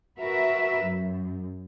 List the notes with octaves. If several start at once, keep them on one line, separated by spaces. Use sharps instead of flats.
F#4 A#4 B4 E5
F#2